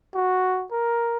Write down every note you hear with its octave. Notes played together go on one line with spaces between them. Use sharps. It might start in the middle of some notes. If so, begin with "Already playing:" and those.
F#4
A#4